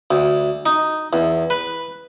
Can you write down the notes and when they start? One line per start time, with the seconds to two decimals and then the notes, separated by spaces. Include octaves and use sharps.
0.11 D2
0.66 D#4
1.13 E2
1.50 B4